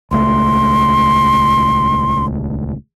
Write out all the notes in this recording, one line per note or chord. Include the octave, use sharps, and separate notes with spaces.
D#1 C#2 A3 C6